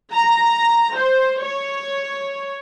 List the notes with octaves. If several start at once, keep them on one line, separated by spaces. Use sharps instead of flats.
A#5
C5
C#5